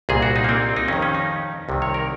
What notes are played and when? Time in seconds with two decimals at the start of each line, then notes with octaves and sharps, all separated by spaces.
0.09 C2 A#2 G#4
0.22 F#4
0.36 D#4
0.44 A#3
0.49 C4
0.77 D#4
0.88 F2 D#3 C#4
1.02 C#4
1.14 D#4
1.69 C2 C3 D#3
1.82 C#5
1.94 A#4